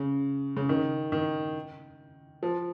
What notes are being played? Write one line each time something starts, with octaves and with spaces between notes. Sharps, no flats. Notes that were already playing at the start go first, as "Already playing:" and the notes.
Already playing: C#3
C#3
D#3
D#3
F3